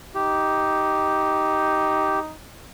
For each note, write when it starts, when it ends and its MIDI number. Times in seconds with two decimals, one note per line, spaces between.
0.15 2.36 63
0.15 2.19 67